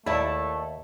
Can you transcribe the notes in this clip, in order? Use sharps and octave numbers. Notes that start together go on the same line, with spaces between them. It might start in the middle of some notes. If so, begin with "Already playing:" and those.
D#2 A3 E4 D5 E5 A5